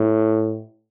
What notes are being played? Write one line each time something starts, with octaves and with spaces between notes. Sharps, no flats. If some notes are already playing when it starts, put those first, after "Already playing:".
Already playing: A2